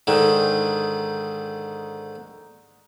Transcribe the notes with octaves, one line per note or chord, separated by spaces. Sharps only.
G#2 D3 D#3